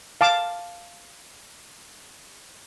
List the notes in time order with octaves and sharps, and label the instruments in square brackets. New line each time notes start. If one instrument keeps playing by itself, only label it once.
[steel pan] F5 A5 D6